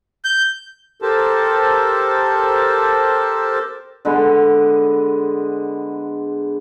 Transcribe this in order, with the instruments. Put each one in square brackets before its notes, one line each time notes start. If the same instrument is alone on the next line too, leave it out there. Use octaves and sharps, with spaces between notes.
[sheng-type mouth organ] G6
[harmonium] G4 A4 A#4 C5 A5
[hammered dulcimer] D3 G#3 B3